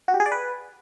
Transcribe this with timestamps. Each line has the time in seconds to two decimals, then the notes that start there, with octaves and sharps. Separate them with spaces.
0.08 F#4
0.14 G4
0.20 G#4
0.26 D5
0.32 B4